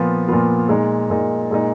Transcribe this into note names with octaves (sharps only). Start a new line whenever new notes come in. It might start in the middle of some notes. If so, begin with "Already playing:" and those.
Already playing: A#2 F3 B3 F4
A#2 F3 B3 F4
A#2 G#3 D#4
A#2 G#3 D#4
A#2 G#3 D#4